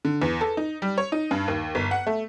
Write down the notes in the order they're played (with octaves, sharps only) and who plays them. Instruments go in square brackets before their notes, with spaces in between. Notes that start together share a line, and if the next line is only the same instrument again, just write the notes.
[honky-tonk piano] D3
E2
A4
D#4
G3
C#5
D#4
G2
D#2
G1
F#5
A3